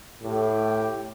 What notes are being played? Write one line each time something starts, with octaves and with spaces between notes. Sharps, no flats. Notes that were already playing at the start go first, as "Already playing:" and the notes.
A2 G4